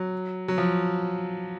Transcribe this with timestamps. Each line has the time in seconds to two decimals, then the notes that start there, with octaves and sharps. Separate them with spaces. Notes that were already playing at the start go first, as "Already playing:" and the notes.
Already playing: F#3
0.48 F#3
0.58 F3